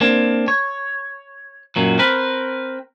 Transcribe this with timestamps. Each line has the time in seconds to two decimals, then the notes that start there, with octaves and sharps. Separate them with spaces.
0.01 A#3 C4 D4
0.48 C#5
1.76 F#2 A#2 F#3
1.99 C4 A#4 B4